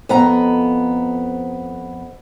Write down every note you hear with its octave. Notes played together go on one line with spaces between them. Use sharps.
F2 B3 A#5